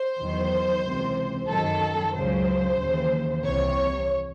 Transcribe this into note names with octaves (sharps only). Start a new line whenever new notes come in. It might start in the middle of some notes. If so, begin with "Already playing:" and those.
Already playing: C5
E2 D#3 F#3
C#2 C3 E3
F#2 D#3 F#3 A4
C#2 C#3 F#3 C5
D#2 C#3 E3
C2 C3 E3 C#5